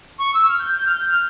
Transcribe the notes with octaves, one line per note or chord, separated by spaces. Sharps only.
C#6
E6
F6
G6
G6
F6
G6
F6